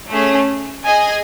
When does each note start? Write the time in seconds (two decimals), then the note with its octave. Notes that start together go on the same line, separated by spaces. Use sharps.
0.11 A3 C#4 G#4
0.84 G#4 D#5 G#5